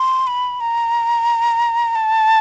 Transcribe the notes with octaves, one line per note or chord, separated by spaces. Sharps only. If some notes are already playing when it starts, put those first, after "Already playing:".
Already playing: C6
B5
A#5
A5